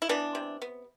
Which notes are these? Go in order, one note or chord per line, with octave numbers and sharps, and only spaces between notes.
E4
E3 B3 D4
C3
B3